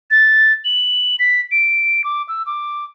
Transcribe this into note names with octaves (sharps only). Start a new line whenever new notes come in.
A6
F#7
B6
D7
D6
E6
D6